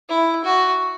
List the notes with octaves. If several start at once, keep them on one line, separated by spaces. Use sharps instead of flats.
E4
F#4